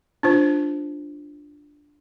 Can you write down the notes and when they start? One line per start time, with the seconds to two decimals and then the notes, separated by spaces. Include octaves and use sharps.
0.23 D4 F4 C5